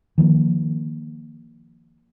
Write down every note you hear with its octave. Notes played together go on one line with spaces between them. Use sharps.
D#3 F3 G3 A#3